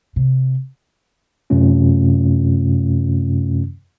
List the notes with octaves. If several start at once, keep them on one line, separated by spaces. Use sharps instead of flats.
C3
F#2 C3 A3 C#4 F4